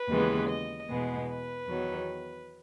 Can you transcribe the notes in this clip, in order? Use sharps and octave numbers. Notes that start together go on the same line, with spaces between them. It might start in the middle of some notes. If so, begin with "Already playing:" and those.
Already playing: B4
D#2 C#3 E3 G#3 B3
D#5
E2 B2 G#3 B3
B4
E2 D#3 F#3 B3